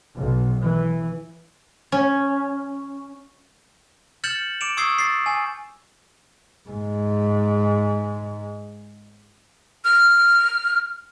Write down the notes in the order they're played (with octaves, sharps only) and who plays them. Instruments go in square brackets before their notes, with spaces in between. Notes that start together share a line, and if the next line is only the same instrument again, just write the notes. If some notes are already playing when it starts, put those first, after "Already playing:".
[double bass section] B1
E3
[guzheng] C#4
[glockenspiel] F6 G6 A6 C#7 E7 F#7
D6 C#7 D7 E7 F7
C#6 D#6 E6 G#6 C7
A6 C7
G#5
[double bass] G#2 G#3
[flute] F6